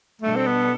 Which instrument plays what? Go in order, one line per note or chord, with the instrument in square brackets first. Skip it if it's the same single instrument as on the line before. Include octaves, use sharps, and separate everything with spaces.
[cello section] B2 G3 D4 A4 [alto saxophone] A3
[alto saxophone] C4
B3